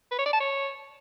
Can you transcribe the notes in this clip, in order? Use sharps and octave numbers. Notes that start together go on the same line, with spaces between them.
B4
C#5
D5
A5
C#5